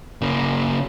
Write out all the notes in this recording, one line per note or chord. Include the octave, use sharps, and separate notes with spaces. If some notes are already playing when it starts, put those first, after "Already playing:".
C#3 A#3